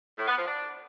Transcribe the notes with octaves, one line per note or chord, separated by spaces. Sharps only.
A2
B3
F3
D4